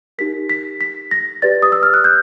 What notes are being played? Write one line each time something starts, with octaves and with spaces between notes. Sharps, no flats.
D#4 G4 A#4 B6
B6
B6
A#6
G4 B4 D5 A6
D#6
E6
F6
F#6
G6